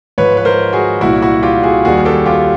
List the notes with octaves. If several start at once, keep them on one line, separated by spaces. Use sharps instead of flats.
G#2 F3 B4 C#5
B4
A#4 C5
F#4 G#4
C2 A#2 F#3 E4 F#4
E4 F#4
F4 G4
F#4 G#4
D#2 D#3 G3 F#4 G#4
G4 A4
F4 G4